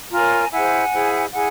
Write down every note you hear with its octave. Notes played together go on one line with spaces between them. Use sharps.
F4 A#4 C#5 G#5 A#5
E4 G#4 C5 F#5 G#5
E4 G#4 C5
E4 G#4 F#5 G#5